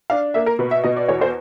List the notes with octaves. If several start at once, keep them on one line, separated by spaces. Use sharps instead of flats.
D4 F5
A#3 E5
A#4
B2 B4
E5
B2 D#5
D5
E2 C#5
C5